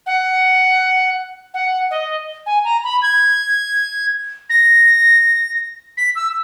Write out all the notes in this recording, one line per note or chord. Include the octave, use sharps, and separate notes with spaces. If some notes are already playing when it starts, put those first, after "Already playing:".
F#5
F#5
D#5
G#5
A#5
B5
G#6
A#6
B6
E6